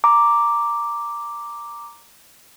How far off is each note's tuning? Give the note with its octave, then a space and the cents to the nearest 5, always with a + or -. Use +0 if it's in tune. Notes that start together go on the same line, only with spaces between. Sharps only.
A#5 +0 D6 +0